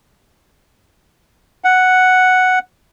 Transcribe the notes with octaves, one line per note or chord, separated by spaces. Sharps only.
F#5